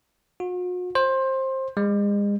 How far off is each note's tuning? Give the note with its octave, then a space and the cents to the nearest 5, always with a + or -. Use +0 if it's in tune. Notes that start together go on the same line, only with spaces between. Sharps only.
F#4 -45
C5 +20
G#3 -35